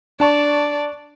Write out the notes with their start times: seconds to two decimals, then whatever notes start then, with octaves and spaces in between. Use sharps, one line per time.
0.20 D4 D5 A5 C#6